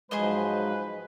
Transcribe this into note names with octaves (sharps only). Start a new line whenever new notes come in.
G#2 F3 F#3 G#3 G#4 B4 C5 D#5